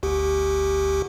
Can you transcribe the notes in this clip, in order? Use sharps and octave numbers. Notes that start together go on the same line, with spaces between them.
G1 D2 G4